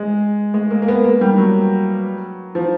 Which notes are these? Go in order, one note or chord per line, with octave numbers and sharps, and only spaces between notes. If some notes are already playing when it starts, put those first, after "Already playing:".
Already playing: G#3
G#3
A#3
A#3
B3
A#3
G3
F#3
F3